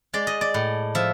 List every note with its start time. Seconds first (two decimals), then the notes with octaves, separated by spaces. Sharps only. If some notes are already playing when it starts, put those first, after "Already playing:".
0.13 G#3 D5
0.27 D#5
0.41 D5
0.54 A2
0.95 F3 E5